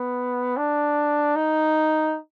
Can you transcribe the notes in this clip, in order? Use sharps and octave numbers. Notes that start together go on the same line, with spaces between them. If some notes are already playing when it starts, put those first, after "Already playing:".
Already playing: B3
D4
D#4